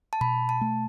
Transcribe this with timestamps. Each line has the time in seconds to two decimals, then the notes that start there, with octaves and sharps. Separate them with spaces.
0.13 A5
0.21 B2 B5
0.49 A5
0.61 A3